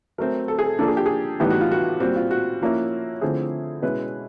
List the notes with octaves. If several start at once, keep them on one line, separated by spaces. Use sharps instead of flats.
F#3 A3 C4 A#4
A4
G#4
A4
F3 A#3 D4 A4
G#4
G4
G#4
A2 E3 G3 B3 D#4 G4
F#4
F4
F#4
A#2 G3 C4 F#4
F4
F#4
F3 A#3 C#4 E4
D3 F3 A3 C4 E4 G#4
B2 G#3 C#4 E4 B4